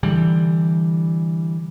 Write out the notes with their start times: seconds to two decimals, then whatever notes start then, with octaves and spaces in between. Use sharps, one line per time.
0.03 D3 E3 G3